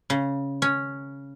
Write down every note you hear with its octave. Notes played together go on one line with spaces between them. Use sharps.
C#3
C#4